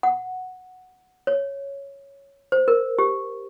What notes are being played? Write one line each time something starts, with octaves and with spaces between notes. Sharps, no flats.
F#5
C#5
C5
A#4
G4